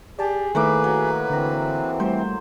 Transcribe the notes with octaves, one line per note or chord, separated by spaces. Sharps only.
G4 G#4 D5 A5
A2 D#3 A3 A#3 B4 D6
F#3
D3 E3 C4 A#5
G3 A3 C5